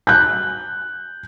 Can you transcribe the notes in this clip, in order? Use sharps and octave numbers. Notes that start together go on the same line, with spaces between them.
F#6 G6